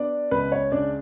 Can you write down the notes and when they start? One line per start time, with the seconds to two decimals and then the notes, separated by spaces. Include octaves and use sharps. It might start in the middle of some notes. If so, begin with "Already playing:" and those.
Already playing: B3 D4 D5
0.31 C#2 B4
0.52 C#5
0.72 C#3 D4 D5